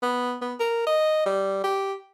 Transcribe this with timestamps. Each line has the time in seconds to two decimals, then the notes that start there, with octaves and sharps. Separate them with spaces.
0.02 B3
0.41 B3
0.60 A#4
0.86 D#5
1.26 G3
1.64 G4